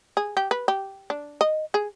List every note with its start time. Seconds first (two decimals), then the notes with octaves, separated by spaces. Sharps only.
0.17 G#4
0.37 G4
0.51 B4
0.68 G4
1.10 D4
1.41 D#5
1.74 G#4